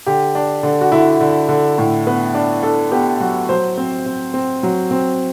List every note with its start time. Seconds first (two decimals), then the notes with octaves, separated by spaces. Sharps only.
0.06 D3 G4
0.35 D4
0.63 D3
0.81 F#4
0.92 D3 E4
1.20 D3
1.49 D3
1.78 A2
2.07 B3
2.35 D4
2.63 D4 A4
2.92 B3 G4
3.20 F#3 F#4
3.49 F#3 C5
3.78 C4
4.06 C4
4.34 C4
4.63 F#3
4.91 C4